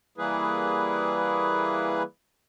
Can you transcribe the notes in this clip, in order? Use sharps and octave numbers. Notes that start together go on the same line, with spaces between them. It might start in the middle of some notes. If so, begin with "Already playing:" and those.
E3 G3 A#3 E4 G#4 B4